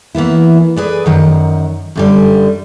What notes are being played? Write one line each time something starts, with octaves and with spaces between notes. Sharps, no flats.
E3 A#3 B3 E4
G#4 B4 D5
F#2 D#3 F#5
F#2 D3 G3